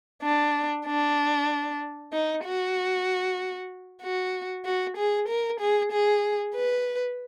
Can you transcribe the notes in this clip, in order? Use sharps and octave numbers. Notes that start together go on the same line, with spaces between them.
D4
D4
D#4
F#4
F#4
F#4
G#4
A#4
G#4
G#4
B4